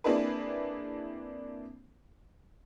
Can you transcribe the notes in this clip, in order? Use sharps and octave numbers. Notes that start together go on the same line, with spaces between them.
A#3 C4 D4 E4 G#4 B4